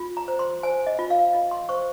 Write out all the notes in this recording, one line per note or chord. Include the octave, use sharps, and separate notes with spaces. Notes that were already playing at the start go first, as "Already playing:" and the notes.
Already playing: F4
A#5
C5
C6
C5 G#5
D#5
F4
F5
F4 D#5
C6
C5 C#6